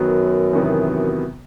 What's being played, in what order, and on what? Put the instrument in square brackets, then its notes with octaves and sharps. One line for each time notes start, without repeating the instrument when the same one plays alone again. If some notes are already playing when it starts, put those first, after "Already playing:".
Already playing: [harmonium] F#2 [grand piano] D#3 F#3 B3
[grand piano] E2 C3 D#3 F#3 B3